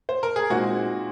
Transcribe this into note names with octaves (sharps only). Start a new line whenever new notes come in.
C5
A#4
G#4
A#2 G#3 C4 D#4 F#4